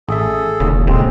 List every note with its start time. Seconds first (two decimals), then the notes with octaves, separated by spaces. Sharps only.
0.09 A1 G#4 A4 E5
0.60 E1 D#2 C#3
0.87 D#1 D#2 A2 C3 G#3 C4